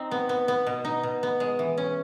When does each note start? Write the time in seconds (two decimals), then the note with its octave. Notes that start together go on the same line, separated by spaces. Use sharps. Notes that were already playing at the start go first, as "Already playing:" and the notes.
Already playing: C4 D#4
0.11 B3
0.29 B3
0.48 B3
0.67 B2
0.85 D#4
1.03 B2
1.23 B3
1.40 G#3
1.59 E3
1.78 C#4